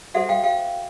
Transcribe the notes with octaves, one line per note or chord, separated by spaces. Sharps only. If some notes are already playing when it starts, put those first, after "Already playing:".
F#4 A4 C5 E5 F#5
F5 G5
F5 G5